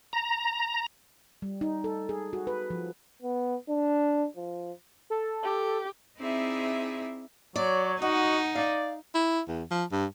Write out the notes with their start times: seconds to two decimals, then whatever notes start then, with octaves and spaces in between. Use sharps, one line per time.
0.13 A#5
1.42 G3
1.61 D#4
1.84 A4
2.09 G#4
2.33 F#4
2.47 B4
2.70 F3
3.22 B3
3.69 D4
4.36 F3
5.10 A4
5.43 G4
6.18 C4 D#4 E4 G#4 D5 E5
7.56 F#3 C#5 D5
8.02 D#4 F#4 D#5 F#5
8.55 D5 F5
9.14 E4
9.48 E2
9.71 F3
9.92 G2